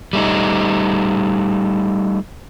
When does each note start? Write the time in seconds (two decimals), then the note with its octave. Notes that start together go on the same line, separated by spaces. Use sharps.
0.13 G3 A3 D#4